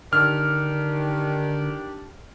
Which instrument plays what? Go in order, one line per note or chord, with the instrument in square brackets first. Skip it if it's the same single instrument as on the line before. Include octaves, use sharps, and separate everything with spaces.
[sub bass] D3 [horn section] D#3 D4 G4 [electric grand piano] F6